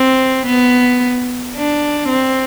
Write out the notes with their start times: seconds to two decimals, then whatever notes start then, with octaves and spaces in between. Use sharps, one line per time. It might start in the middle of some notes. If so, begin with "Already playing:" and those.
Already playing: C4
0.47 B3
1.56 D4
2.09 C4